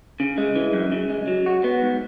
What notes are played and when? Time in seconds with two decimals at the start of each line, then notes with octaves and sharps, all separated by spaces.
0.20 C#3
0.38 G#3
0.56 E3
0.73 F#2
0.92 C#3
1.09 G#3
1.27 F#3
1.46 F#4
1.64 B3
1.82 G#2